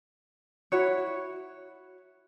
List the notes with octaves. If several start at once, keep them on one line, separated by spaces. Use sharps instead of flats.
E4 F#4 C#5